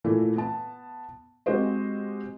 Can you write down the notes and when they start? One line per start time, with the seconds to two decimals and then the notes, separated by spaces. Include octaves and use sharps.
0.04 A#2 E3 A3
0.36 B3 A5
1.46 G#3 C4 F#4 G4 C5 D#5